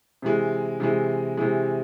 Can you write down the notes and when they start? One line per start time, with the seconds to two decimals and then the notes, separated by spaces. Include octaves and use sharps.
0.22 C3 E3 G#3
0.80 C3 E3 G#3
1.37 C3 E3 G#3